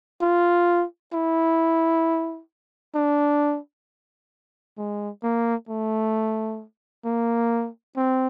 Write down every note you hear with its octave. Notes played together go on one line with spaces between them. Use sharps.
F4
E4
D4
G#3
A#3
A3
A#3
C4